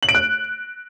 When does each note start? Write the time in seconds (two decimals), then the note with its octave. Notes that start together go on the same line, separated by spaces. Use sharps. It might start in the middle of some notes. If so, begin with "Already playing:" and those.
0.03 F#7
0.09 D7
0.15 F#6